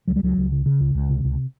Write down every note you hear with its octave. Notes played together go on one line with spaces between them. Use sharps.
C#2 F#3
G3
C#2 F#3
C#2
C#3
C#3
C#2
C#2
C3
C#2